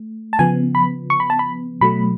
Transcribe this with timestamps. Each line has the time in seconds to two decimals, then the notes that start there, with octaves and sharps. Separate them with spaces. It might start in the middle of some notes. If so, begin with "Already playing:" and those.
Already playing: A3
0.33 A5
0.39 C#3 F3 B3 G#5
0.75 B5
1.10 C#6
1.20 B5
1.30 A5
1.39 B5
1.81 B2 F#3 A3 B5